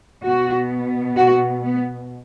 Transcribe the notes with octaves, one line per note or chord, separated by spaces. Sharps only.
B2 B3 F#4
F#4
B3